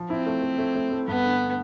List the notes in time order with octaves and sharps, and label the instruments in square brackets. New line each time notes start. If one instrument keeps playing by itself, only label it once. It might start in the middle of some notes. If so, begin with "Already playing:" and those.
Already playing: [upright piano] F3
[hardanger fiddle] C4 [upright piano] E4
[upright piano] A3
A3
A3
A3
A3
[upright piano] G2 [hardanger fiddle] B3
[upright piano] D3